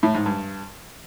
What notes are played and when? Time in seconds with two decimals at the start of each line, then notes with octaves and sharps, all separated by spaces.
0.03 A2
0.14 G#2
0.26 G2